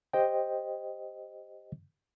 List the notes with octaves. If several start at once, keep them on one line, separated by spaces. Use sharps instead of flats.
G4 C5 D#5 G5